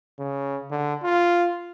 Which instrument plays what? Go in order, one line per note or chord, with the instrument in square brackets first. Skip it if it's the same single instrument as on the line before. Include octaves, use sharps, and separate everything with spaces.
[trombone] C#3
D3
F4